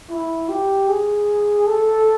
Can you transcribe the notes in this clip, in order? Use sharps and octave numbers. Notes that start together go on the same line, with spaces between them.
E4
G4
G#4
A4